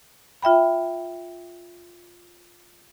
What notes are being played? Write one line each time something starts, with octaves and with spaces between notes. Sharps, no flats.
F4 E5 G5 B5